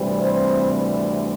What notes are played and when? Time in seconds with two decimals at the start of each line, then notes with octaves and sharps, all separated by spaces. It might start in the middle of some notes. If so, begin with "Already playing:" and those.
Already playing: D2 C3 E3 G3 C4
0.17 C5